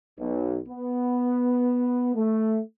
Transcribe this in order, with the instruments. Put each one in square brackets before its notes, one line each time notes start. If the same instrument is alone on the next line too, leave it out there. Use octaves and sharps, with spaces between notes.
[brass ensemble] B1
B3
A3